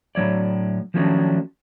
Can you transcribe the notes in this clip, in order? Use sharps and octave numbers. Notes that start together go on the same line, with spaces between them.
A2 D3 F#3 C#5 D5
D#3 F3 F#3 A3 C#4 D4